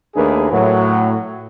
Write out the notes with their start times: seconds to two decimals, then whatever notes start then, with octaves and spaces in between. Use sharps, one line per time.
0.15 D#2 A3 D4 G#4 A#4 B4
0.51 A2 F#3